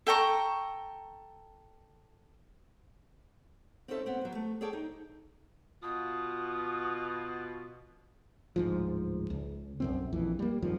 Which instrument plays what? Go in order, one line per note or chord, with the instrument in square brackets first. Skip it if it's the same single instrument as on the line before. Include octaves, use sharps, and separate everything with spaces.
[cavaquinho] A4 G5 A#5 C#6
[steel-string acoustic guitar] C4 C#4 D#4 E4 A4 E5
B3 C4
F#3 B4
A3
G#4 A4 C#5 D5 G5 A5
D#4
[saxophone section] B2 F4 [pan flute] D#6
[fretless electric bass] D1 G#2 F3
C#2
B1 F#2 C4
A#1 F2 E3
G3 A#3
G#1 F#2 D#3 F3